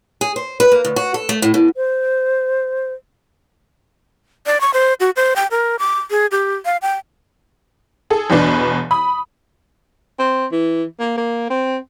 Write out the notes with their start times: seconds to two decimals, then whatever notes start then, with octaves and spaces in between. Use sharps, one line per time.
0.21 G#4
0.36 C5
0.60 B4
0.72 A#3
0.85 D2
0.96 F#4
1.14 A4
1.29 A3
1.42 A2
1.54 B2
1.76 C5
4.46 D5
4.61 C#6
4.74 C5
5.00 F#4
5.16 C5
5.36 G5
5.51 A#4
5.79 D6
6.11 G#4
6.31 G4
6.65 F5
6.82 G5
8.10 G#4 A4
8.30 G1 E2 B2 D4 B4
8.91 B5 D#6
10.19 C4
10.51 E3
10.99 A#3
11.17 A#3
11.50 C4